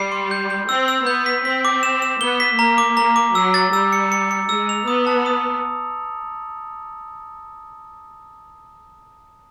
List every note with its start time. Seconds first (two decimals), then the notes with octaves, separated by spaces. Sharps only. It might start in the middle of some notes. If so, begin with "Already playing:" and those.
Already playing: G3 C7
0.12 C6
0.31 G6
0.50 G6
0.69 C4 E6
0.88 E6
1.07 B3 G6
1.26 B6
1.45 C4 B6
1.65 D6
1.83 E7
2.02 E7
2.21 B3 G7
2.40 B6
2.59 A#3 A#5
2.78 D6
2.97 A#3 A#5
3.16 D6
3.35 F#3 E6
3.54 A6
3.73 G3 E6
3.93 C#7
4.12 C#7
4.31 C#7
4.49 G#3 E6
4.69 F7
4.87 B3 D#6
5.07 A5
5.26 D#6